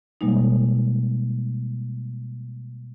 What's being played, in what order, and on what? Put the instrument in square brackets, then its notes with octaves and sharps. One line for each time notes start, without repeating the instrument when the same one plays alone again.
[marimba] B2 G3 G#3 A#3 D#4